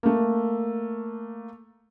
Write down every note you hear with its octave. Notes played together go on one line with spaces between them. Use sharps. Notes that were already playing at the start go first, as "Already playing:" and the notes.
A3 A#3